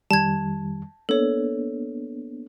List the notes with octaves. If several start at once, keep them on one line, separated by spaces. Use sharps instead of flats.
F2 D#3 G3 A5 G#6
A#3 B3 D4 A4 C#5